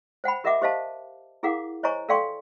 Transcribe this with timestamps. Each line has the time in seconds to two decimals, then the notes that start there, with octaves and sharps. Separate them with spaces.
0.24 C5 F#5 G5 B5
0.44 G4 A#4 D#5 E5 F#5 D6
0.62 G4 C5 D#5 F5 A5
1.43 E4 G#4 A#4 F5 F#5 D6
1.83 C5 C#5 D#5 G#5 A#5 C#6
2.09 A4 D5 F5 G5 C6 C#6